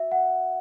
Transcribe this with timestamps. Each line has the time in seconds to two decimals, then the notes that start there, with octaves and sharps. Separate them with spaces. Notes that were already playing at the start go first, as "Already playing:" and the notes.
Already playing: F#4 E5
0.11 F#5